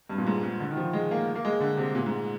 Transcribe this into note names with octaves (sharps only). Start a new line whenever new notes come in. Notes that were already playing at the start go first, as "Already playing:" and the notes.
G2
A#2
G#2
G#2
D3
D#3
F3
G#3
A#3
A#3
G#3
D3
C3
A#2
G#2